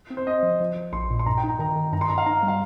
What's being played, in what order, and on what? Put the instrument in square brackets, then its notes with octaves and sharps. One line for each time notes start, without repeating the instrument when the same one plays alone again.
[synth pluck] C4
[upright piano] C5
[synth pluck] C4 [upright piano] D#5
[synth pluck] F3
F3
F3
[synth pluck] A#1 [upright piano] C6
[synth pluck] A#2
[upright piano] C6
[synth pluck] G2 [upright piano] A#5
[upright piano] G5
[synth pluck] D#4
[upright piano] A#5
[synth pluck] D#3 [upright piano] A#5
[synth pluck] D#3
[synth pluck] G2 [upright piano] A#5
[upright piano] C6
[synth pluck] G2 [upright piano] A#5
[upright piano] F5
[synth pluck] D#4 [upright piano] A#5
[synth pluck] G3
[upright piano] F5